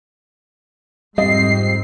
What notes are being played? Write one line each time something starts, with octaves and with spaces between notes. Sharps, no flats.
F2 G#2 G3 C4 D#5 C7